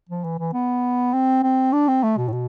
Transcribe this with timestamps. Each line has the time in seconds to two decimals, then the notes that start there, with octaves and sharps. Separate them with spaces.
0.09 F3
0.24 E3
0.39 E3
0.53 B3
1.13 C4
1.43 C4
1.73 D4
1.88 C4
2.03 A3
2.17 B2
2.28 A2
2.33 B2